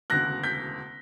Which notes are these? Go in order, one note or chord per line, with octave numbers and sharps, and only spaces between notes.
E1 D2 C#3 F#6 A#6
G6 B6